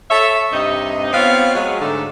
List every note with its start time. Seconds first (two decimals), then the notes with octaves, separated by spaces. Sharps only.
0.10 A4 C#5 E5
0.52 G2 C3 D#4 D#5
1.13 B3 C4 F4 C#5 F5
1.55 F#3 G#3
1.81 G#2 D3 A3 A4